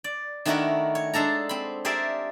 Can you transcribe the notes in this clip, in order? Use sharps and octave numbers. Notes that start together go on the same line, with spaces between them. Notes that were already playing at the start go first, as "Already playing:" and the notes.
D5
D#3 A3 D4 E4 F#4 A#4
C#5
G#3 D4 A4 A#5
C4 B5
G4 G#4 A#4 C5 D5 E5